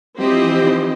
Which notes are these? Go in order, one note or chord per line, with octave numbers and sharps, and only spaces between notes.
F#3 C4 E4 G4 C5 D#5
F3
E3
D#3